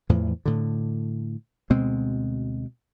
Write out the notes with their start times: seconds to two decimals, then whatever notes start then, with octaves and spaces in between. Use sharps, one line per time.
0.09 E2 A2 E3 F3
0.45 A2 D3
1.70 D2 B2 G#3 C4